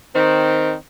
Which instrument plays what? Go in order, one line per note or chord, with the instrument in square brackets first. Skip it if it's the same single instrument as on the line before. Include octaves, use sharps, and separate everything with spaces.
[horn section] D#3 C4